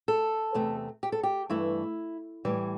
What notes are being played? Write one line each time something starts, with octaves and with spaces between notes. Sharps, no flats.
A4
E2 C3 A3
G4
A4
G4
G2 E3 A3 E4
A2 E3 G3